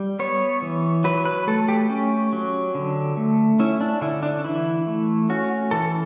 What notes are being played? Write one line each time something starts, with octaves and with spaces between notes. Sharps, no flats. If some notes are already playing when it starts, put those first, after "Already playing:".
Already playing: G3
B3 C#5
E3
F#3 B4
B4
A3 A4
G4
C#4
F#3
D3
A3
C#4 E4
D4
D3 E4
D4
E3 E4
A3
C#4 F#4
E3 A4